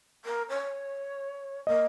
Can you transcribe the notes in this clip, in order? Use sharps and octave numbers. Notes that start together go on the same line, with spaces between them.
A#4
C#5
A#3 D#5